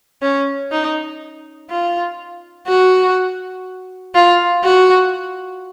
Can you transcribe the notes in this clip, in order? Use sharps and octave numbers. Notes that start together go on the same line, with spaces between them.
C#4
D#4
F4
F#4
F4
F#4